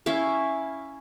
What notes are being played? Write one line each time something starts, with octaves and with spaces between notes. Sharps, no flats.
C#4 E4 E5 F5